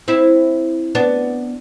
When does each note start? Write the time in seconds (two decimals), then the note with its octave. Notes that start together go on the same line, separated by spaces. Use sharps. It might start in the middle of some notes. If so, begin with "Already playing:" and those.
0.08 C4 E4
0.95 B3 D4